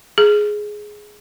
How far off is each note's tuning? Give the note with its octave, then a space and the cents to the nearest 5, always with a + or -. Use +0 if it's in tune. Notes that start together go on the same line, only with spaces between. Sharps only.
G#4 +10